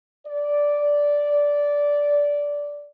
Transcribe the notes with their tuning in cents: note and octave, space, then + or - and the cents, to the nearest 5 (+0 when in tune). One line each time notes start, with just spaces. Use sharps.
D5 -10